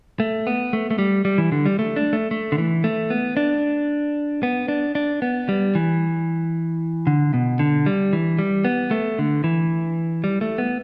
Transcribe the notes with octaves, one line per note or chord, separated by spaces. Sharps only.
A3
B3
A3
A3
G3
G3
E3
D3
G3
A3
D4
A3
A3
D3
E3
A3
B3
D4
B3
D4
D4
B3
G3
E3
D3
B2
D3
G3
E3
G3
B3
A3
D3
E3
G3
A3
B3